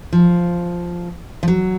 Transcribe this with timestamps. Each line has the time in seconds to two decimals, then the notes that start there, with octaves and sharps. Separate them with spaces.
0.13 F3
1.43 F3
1.48 F#3